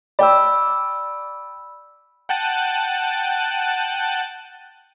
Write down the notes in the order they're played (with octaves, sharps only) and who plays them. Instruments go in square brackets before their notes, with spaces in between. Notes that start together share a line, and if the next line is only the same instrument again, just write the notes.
[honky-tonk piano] D5 G5 [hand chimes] B5 E6
[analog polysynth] F#5 G5 A5 F#6 A6 D#7